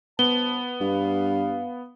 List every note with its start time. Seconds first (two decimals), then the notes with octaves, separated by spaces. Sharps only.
0.19 G2 B3 C5 A5 G7
0.81 G2 F5